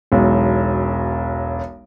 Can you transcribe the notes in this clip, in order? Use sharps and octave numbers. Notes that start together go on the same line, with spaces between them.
E1 B1